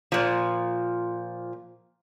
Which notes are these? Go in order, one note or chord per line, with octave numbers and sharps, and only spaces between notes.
A#2 F3